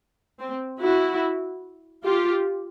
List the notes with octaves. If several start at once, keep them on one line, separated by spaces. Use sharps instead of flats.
C4
E4 F#4
F4 G4